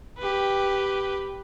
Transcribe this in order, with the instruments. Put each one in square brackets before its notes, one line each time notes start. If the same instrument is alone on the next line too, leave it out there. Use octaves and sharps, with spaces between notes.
[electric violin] G4 B4